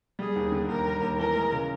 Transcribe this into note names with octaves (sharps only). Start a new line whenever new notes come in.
G3 G#4
D#2
D3
D#2 A#4
G3
D#2
E3 A#4
G#3
C#3